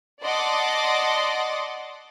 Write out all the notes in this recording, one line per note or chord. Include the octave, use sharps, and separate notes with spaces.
D5 D#5 F#5 A5 C6 D6